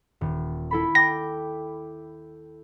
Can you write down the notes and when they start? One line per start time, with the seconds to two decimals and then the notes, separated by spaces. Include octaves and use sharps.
0.21 D#1
0.71 E4 A4 B5
0.95 G5 D6 A#6